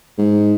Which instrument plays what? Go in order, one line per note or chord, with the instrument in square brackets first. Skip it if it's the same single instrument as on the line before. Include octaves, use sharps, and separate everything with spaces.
[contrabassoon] G#2